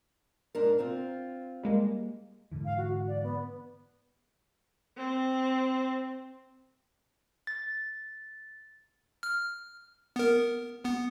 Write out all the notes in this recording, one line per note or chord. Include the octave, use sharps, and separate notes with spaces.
G#2 D4 A#4
C4 F4
G3 G#3 A#3
G#2 D3 E3
F5
F#4
D5
B3
C4
A6
F6
B3 A#4
B3